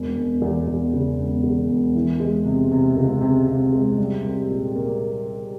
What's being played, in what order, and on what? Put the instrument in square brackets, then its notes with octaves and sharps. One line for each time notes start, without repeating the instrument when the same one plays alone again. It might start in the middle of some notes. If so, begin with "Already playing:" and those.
Already playing: [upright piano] E1
E1
E2
E2
C#3
E1
E2
E1
E3
G#3
C3
C3
C#2
C3
C3
G#3
G3
C2
A#2
A#3